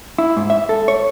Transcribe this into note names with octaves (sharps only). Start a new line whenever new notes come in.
E4
G#2
E5
A4
C#5